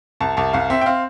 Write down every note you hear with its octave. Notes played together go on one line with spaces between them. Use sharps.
C2 A5
C2 A5
C2 F5
C4 E5
G5
C4 F5